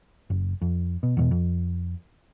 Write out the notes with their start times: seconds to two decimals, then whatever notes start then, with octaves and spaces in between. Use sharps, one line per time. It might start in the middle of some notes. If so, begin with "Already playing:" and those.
0.30 F#1
0.62 F2
1.03 B2
1.17 E2 G2 B2
1.31 F2